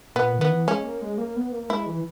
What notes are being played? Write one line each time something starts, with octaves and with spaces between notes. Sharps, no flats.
A#2 B3
D#3 B3
E3
G#3 C#4
A#3
G#3
A#3
B3
A#3
G#3 E4
E3